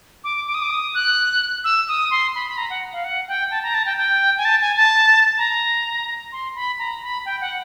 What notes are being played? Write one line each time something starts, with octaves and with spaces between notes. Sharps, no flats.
D6
D6
D#6
D6
D#6
F#6
E6
D#6
C6
B5
B5
A#5
F#5
F5
F#5
G5
A5
A#5
A5
G5
G5
G#5
A5
G#5
A5
A#5
C6
B5
A#5
B5
G5
F#5